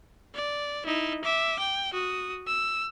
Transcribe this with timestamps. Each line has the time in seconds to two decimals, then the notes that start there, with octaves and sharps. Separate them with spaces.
0.35 D5
0.86 D#4 E4
1.24 E5 D6
1.59 G5
1.93 F#4 D#6
2.47 E6